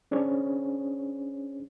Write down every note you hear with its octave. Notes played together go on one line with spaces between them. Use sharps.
C#4 D4 G#4 C5 C#5